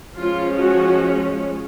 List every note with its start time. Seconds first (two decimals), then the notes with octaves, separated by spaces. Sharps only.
0.16 F3 G#3 C#4 F4
0.58 F#4